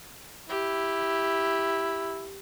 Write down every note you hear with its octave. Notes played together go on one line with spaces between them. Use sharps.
E4 G4